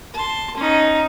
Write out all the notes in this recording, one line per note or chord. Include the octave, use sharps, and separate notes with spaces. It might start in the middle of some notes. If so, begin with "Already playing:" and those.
A5 C6
C#4 D#4